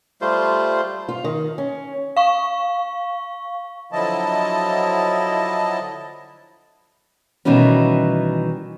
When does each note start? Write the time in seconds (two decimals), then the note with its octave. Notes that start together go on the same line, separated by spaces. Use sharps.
0.21 G3 A3 F4 C5
1.09 F4
1.24 D#3
1.58 C#4
2.17 F5 C#6
3.92 D3 F3 F#3 E4 D#5 A5
7.45 B2 D#3 E3 G3 C#4